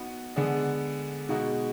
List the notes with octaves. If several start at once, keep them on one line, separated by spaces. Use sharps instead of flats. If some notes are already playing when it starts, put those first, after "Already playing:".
Already playing: B3 D#4 F#4
D3 G#3 B3 D4 G#4
B2 G#3 D#4 F#4